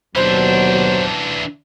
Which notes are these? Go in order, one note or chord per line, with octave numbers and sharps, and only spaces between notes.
D#2 B2 E3 F#3 D4 C5